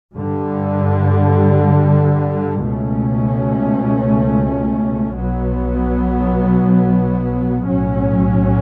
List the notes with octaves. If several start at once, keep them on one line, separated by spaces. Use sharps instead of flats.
G2 D3 G3
C#2 B2 A3 C#4
B1 B2 F#3 B3
B1 A2 F#3 C#4